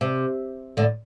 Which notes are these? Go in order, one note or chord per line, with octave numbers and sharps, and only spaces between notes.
C3
A2 D3